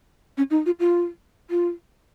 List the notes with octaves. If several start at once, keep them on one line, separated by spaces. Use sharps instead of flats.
C#4
D#4
F4
F4
F4